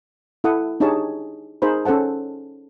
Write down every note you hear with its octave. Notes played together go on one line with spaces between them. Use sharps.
E4 A4 F#5 D#6
D4 D#4 G4 G#4 C#5 A5
D#4 G#4 A#4 C5 B5
C#4 A4 C5 F#5 A5